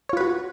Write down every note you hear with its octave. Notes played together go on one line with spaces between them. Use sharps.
F4 F#4 B4 C#5